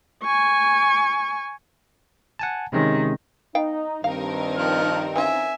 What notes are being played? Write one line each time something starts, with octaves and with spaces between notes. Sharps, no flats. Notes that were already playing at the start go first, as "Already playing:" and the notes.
G#5 C#6
F#5 G#5 A5
C3 D#3 G#3 C#4
B3 D#4 F5 G5
G2 D#3 C4 D#4 A#4 F5
F3 F6
E3 C#4 F4 E5 G#5